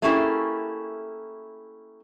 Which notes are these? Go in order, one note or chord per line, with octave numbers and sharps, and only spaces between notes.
A3 A#3 C#4 E4 G4 G#4